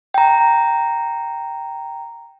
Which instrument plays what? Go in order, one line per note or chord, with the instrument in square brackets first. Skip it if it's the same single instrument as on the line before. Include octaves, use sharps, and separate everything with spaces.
[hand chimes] G5 A#5